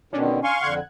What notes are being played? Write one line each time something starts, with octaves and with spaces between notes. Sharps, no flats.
B2 D3 D#3 C#4 D4
F5 G#5 C6 C#6
F2 D3 F#5 F#6 G#6